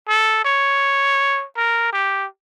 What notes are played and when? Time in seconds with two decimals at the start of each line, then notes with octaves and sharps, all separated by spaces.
0.08 A4
0.45 C#5
1.57 A#4
1.93 G4